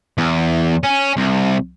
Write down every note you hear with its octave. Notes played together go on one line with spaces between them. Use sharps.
E2
C#4
C2